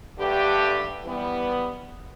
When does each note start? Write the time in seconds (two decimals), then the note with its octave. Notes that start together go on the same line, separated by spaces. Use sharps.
0.16 G2 D3 A3 G4 B4
1.02 E3 G3 B3